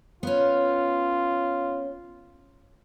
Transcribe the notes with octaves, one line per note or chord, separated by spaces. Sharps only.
B3 C#4 F4